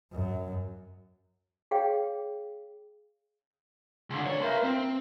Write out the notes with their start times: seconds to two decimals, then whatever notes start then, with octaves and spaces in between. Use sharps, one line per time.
0.13 F#2
1.71 G#4 C#5 F5 G5
4.10 C#2 D3
4.26 D2 C#5 D5 A#5
4.41 A#4 B4 E5 F5 C6
4.63 C4 A#5